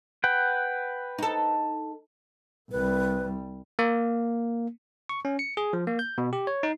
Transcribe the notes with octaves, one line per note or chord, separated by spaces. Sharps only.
B4 F#5 G5
D#4 A4
C2 G3 B4
A#3
C#6
C#4
C#7
G#4
F3
A#3
G6
B2
G4
C#5
D#4